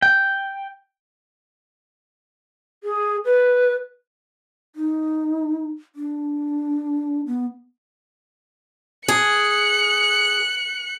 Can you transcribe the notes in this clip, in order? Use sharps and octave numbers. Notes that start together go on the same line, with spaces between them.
G5
G#4
B4
D#4
D4
B3
G#4 F#6 C#7